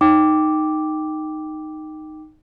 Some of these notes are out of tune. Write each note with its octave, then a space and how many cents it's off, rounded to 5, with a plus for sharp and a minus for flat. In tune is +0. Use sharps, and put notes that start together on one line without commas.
D#4 -5 G5 +0 D6 +0